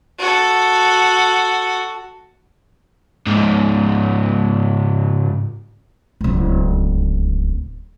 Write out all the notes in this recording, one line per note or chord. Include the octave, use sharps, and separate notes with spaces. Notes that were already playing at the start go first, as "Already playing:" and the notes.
F#4 A4
C#2 G#2
D1 C#2